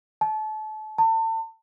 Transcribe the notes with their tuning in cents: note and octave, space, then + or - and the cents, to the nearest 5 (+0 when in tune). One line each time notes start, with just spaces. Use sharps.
A5 -30
A5 +35